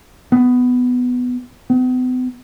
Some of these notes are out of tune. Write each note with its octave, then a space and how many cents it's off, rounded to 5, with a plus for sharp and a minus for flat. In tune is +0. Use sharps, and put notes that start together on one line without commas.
B3 +10
B3 +45